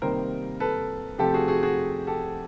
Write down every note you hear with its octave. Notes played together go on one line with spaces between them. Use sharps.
C3 D#3 G3 A#3 A#4 C5
A4 B4
C3 F3 A3 G4 A4
F#4 G#4
F#4 G#4
F#4 G#4
G4 A4